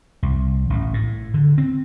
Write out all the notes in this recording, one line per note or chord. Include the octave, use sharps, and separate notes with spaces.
C2
A1
A2
D3
C4